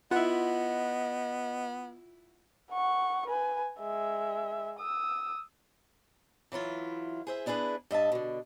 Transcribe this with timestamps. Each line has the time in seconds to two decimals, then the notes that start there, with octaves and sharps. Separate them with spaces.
0.11 B3 E4 F4 D#5 F#5
2.71 F#5 C#6
3.26 B4 G#5
3.80 G#3 E5
4.79 D#6 E6
6.52 E3 F#3 E4 F4
7.27 G#4 C5 E5
7.46 B3 D4 E4 G#4 B4
7.91 G2 D#5 E5 A5
8.12 B2 D3